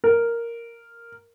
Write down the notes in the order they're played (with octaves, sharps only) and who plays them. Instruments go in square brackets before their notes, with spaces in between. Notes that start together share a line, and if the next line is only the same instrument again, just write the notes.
[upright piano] A#4